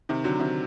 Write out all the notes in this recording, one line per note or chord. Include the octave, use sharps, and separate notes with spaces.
C3 D#3
D3 F#3
C3 D#3